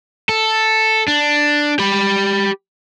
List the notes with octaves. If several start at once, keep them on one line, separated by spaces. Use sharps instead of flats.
A4
D4
G4 B5